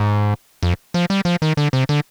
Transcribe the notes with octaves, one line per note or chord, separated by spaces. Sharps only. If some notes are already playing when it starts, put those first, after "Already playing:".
Already playing: G#2
F2
F3
G3
F3
D#3
D3
C3
D3